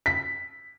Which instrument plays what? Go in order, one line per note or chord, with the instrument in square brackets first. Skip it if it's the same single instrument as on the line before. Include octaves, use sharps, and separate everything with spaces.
[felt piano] B6